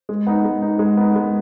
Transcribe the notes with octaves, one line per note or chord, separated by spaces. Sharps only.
G#3
B3 D#4
G#3
B3 D#4
G#3
B3 D#4
G#3